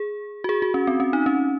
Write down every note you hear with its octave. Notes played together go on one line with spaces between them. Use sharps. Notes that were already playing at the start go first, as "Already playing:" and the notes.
Already playing: G#4
F#4
G#4
F#4
C#4
C4
C#4
D#4
C#4